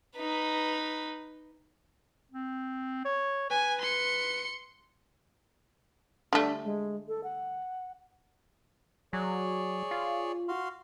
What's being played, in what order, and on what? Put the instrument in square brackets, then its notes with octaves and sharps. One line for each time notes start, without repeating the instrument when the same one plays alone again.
[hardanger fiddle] D#4 B4
[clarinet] C4
C#5
[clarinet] B4 [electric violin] G#5
[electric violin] C6 C#7
[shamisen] D3 G3 A3 [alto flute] D4
[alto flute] G#3
A4
F#5
[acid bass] F#3 [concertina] G#4 C#5 D5
[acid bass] F4
[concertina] F#4 F5 C6